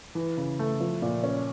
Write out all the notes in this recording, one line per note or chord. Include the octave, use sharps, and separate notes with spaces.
E3
C#3
A3
F3
A#2
C#4